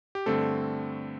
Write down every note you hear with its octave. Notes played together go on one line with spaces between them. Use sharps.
G4
G2 D3 A3 C4 A4